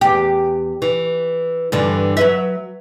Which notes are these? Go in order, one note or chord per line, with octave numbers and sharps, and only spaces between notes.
E2 G4
E3
G2 D3 E3
F#3 B4 E5